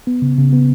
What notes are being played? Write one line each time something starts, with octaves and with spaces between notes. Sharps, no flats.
B3
C#3
C#3
B3